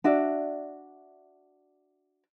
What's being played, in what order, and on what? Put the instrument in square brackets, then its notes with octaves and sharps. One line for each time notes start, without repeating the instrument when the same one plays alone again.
[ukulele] D4 F#4 D5 E5